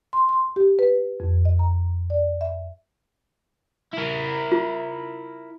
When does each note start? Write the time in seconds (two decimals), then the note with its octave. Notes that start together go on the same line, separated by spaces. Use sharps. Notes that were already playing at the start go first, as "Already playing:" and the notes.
0.13 C6
0.29 C6
0.56 G4
0.79 B4
1.20 F2
1.45 D#5
1.59 A#5
2.10 D5
2.41 E5
3.94 E4 A#4
4.52 F4